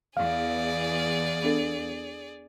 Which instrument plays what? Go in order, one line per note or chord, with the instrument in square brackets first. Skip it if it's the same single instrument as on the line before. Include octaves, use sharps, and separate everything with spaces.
[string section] E2 [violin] G#4 D5 [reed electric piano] F5
[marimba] B3 D4 A4